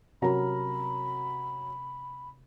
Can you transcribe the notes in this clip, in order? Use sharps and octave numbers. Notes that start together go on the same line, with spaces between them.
C3 F#3 C#4 A#4 A#5 B5